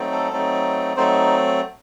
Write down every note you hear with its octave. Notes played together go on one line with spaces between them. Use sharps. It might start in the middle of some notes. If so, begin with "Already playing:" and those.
Already playing: F#3 A3 C4 D#4
A4
F#3 A3 C4 D#4
F#3 A3 C4 D#4 C5